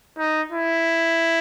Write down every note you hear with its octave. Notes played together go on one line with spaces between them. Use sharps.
D#4
E4